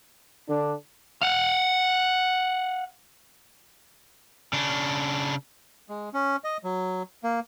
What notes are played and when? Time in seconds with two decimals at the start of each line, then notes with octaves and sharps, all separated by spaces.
0.49 D3 D4
1.22 F5 F#5
4.53 C#3 D4
5.89 G#3
6.14 C#4
6.44 D#5
6.64 F#3
7.24 A#3